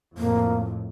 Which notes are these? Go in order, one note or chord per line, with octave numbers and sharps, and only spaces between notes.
F2 A2 A#3